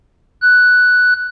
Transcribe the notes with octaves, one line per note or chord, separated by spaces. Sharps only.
F#6